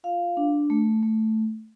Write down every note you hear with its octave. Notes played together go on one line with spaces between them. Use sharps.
F4 F5
D4
A3
A3